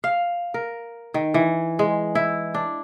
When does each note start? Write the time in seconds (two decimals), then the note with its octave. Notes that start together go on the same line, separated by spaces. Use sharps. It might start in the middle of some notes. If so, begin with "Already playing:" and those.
0.04 F5
0.54 A#4
1.14 D#3
1.34 E3
1.79 G#3
2.15 E4
2.54 D4